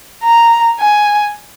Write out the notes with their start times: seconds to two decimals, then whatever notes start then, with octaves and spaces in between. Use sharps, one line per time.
0.23 A#5
0.79 G#5